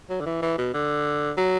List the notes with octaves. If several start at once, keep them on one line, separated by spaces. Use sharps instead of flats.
F#3
D3
E3
E3
B2
D3
F#3